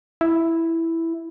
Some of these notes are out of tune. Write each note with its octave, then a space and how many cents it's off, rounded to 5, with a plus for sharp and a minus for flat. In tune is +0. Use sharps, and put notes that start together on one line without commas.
E4 +0